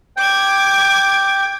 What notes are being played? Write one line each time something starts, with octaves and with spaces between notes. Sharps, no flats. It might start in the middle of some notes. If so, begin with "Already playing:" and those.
G5 D6 G#6